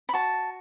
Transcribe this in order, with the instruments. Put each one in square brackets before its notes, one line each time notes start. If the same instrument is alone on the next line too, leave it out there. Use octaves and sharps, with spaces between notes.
[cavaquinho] B5
F#4 A5